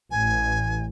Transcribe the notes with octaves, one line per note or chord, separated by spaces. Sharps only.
A1 G#5